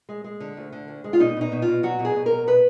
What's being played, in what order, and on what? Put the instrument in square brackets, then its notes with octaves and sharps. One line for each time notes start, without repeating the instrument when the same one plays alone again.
[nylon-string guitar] G#3
G#3
D3
D2
D3
D2
G#3
F4
B2 D#4
B2 D#4
B2
F4
B2
F#3 F#4
B2
G#4
B2
A#4
F#3
B2 B4